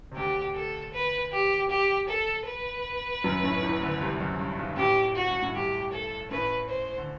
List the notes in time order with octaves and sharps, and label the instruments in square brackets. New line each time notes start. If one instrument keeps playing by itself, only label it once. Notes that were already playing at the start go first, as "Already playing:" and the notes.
[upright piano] C3
[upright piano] D2 D3 [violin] G4
[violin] A4
B4
G4
G4
A4
B4
[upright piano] F#2 F#3
A1 A2
E2 E3
D2 D3
C2 C3
F#2
G2
B1 B2
[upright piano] A1 A2 [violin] G4
[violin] F#4
[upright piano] G2
A2
[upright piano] G2 [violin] G4
[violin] A4
[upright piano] A1 A2 [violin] B4
[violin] C5
[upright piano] D3